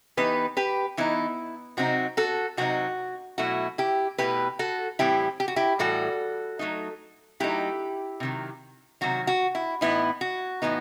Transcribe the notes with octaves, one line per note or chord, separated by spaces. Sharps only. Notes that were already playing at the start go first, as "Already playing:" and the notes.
E3 B3 D#4 G4 B4
G4 B4
E3 B3 D#4 E4
C3 F#3 C4 D#4 F#4
F#4 A4
C3 F#3 C4 D#4 F#4
B2 F#3 A3 E4 F#4
E4 G4
B2 F#3 A3 E4 G4 B4
F#4 A4
A2 E3 G3 C4 E4 G4
G4
F#4
E4 G4
A2 E3 G3 F#4 A4
F#3 A3 D#4
F#3 A3 D#4 E4 G4
C3 D#3 F#3
C3 D#3 F#3 F#4
F#4
E4
A2 E3 B3 D#4 E4
F#4
A2 E3 B3 D#4